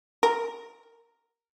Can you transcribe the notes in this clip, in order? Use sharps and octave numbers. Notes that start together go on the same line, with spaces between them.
A#4